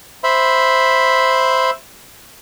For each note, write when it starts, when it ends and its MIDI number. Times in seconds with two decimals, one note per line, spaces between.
0.24 1.70 72
0.24 1.70 76
0.24 1.70 83